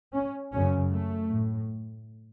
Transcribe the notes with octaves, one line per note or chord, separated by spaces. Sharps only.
C#4
F#2 C#3 C#4
A3
A2